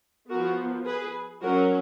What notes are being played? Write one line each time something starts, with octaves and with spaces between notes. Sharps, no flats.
F3 B3 F#4 A#4
G#4 B4
F#3 C#4 F#4 A#4